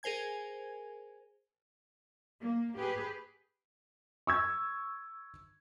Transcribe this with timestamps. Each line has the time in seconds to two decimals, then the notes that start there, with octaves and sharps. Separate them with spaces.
0.03 G#4 A#4 C5 G#5 G#6
2.40 A#3
2.77 G4 G#4 B4
4.27 C#6 E6 G#6